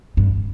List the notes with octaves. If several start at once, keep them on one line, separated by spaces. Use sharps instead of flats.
G2